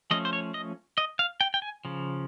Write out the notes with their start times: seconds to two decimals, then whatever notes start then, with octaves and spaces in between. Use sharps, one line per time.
0.11 F3 A3 C#4 D#5
0.25 C5
0.33 C#5
0.54 D#5
0.98 D#5
1.19 F5
1.41 G5
1.54 G5
1.62 G#5
1.85 C#3 F3